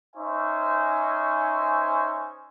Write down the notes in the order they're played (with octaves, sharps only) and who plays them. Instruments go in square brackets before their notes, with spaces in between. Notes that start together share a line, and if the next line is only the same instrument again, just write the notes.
[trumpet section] C#4 D#4 C5 E5 G#5 C#6